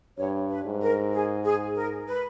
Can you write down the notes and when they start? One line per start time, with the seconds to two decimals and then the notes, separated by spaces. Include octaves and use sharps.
0.18 G2 C#5
0.50 B4
0.65 G#2
0.82 A#4
1.13 G#4
1.45 G#4
1.76 A#4
2.08 B4